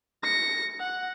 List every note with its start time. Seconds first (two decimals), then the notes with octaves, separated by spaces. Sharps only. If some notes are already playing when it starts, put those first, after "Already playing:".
0.23 A#6 C#7
0.80 F#5